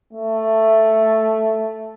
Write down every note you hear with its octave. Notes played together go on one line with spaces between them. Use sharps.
A3